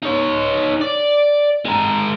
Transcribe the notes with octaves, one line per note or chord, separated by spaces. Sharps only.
D#4 C#5
D5
G#3 A#4